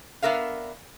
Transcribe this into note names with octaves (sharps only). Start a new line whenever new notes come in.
B3 D4 A#4 E5 F5